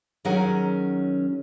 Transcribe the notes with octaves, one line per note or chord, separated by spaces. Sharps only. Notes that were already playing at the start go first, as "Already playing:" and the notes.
D#3 F#3 C#4 G#4 A#4 F#5